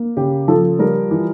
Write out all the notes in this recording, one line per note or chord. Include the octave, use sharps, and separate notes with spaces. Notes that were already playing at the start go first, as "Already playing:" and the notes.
Already playing: A#3
C#3 G4
F3 A4
G3 A#4
E3